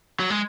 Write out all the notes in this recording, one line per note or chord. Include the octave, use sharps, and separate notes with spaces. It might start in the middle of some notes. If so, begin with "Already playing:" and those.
F#3
G#3